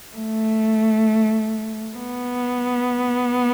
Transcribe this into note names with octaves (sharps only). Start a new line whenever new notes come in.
A3
B3